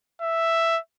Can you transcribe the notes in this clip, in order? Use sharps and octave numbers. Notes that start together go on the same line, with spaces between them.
E5